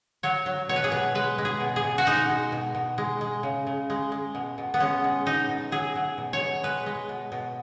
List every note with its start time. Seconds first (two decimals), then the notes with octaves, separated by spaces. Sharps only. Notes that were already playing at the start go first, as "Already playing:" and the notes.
0.23 F#3 C#5
0.46 F#3
0.69 B2 C#5
0.76 B4
0.84 G#4
0.92 B2 B4
1.15 G#3 B4
1.38 G#3
1.45 G#4
1.60 B2
1.76 G#4
1.84 B2
1.98 F#4
2.06 G#3 D#4
2.29 G#3
2.52 B2
2.75 B2
2.98 G#3
3.21 G#3
3.43 C#3
3.67 C#3
3.90 G#3
4.12 G#3
4.35 B2
4.58 B2
4.74 B3
4.80 G#3 C#4
5.04 G#3
5.26 B2 D#4
5.49 B2
5.72 F#3 G#4
5.96 F#3
6.18 B2
6.33 C#5
6.41 B2
6.63 G#3 B4
6.86 G#3
7.09 B2
7.32 B2